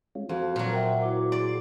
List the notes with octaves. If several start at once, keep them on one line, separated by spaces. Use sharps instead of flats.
G#3 C#4 F4
F2 F#4 A4 C5 F5
A#2 F#3
A#4 C5 E5 F#5 G5
E4 F#4 D6
G#4 D5 C6